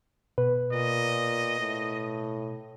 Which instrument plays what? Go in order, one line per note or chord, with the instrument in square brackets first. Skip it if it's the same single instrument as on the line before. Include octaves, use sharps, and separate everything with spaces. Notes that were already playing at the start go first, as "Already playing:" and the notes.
[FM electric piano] B2 [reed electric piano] B4
[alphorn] A#2 [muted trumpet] D#5
[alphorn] A2